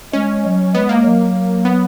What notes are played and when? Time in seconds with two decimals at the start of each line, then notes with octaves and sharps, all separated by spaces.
0.13 G#3 C#4
0.44 F#3
0.74 G#3 B3
0.89 A#3
1.04 F#3
1.65 B3